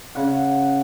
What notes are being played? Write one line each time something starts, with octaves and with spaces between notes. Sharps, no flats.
C#3 F#5